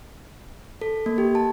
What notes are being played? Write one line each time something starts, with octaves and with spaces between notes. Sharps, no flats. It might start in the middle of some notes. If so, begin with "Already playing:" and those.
A4
A#3
G4
A5